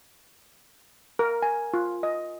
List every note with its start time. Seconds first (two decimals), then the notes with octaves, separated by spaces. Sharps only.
1.19 A#4
1.42 G#5
1.74 F4
2.03 D#5